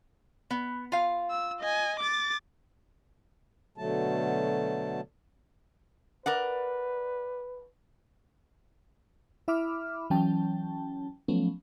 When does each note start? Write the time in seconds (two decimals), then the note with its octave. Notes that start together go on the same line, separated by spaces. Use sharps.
0.50 B3
0.92 F4 F5
1.31 E6
1.60 D#5 G#5
2.00 D6 A6
3.78 B2 D3 F#3 A3 A5
6.26 A#4 B4 D5 F#5
9.48 E4 E5 B5 D6 F6
10.10 E3 F#3 C#4 G5 A5
11.28 F3 F#3 A3 B3 C#4